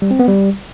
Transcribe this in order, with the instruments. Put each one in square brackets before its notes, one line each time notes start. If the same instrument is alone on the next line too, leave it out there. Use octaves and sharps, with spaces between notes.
[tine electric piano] G3
C4
B3
G3